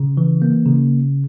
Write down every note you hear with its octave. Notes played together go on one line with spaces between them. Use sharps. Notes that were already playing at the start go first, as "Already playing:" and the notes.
Already playing: C#3
E3
A#3
C#3